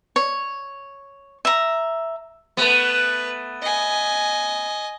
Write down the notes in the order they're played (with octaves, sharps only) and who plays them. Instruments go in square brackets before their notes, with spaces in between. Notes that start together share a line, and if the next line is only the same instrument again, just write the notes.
[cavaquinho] C#5
E5 A#5
[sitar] A3 B3 [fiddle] B4
[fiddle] D#5 G#5